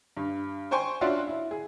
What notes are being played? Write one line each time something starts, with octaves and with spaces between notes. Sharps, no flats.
G2
C5 G5 G#5 C6 C#6
C#4 D4 F4 F#4 E5 C6
E4
G#4